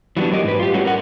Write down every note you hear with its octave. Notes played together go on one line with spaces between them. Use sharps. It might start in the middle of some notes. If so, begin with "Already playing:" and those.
E3 F#3 G3 B3 D4
A2 F#3 G4 A#4 D#5
G#2 B4
F4 G4
G3 A3 C#4 F#4 G4
A#4 F#5